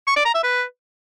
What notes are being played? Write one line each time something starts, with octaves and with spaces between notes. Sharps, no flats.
C#6
D5
A#5
E5
B4